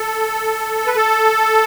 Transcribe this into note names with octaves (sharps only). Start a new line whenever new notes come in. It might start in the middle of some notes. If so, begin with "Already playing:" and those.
Already playing: A4
B4
A4